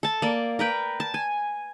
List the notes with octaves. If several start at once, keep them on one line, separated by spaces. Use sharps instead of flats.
A4 A5
A#3 D5
A#4 B4 G5
A5
G#5